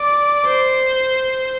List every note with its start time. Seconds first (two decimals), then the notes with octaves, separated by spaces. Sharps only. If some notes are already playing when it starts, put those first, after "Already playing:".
Already playing: D5
0.46 C5